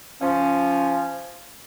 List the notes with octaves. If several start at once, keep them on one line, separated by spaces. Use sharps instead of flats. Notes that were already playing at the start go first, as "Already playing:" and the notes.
F3 C#4